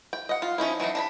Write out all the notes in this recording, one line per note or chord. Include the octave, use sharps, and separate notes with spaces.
G5
D#5 F#5
F4
F3 C#4 D#4 E4
E3 F#3 D4 D#4
D4 A#5 B5